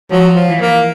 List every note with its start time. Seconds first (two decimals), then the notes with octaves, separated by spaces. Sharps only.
0.11 F3 F#3
0.35 F3
0.49 E3
0.62 A#3